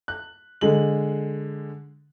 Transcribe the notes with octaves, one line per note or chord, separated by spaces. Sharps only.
F#6
D3 G#3 F#7